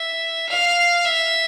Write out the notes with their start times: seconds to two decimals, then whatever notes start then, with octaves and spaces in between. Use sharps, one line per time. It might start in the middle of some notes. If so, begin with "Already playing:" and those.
Already playing: E5
0.49 F5
1.05 E5